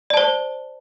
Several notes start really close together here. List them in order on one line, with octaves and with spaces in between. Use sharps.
D5 A5 C5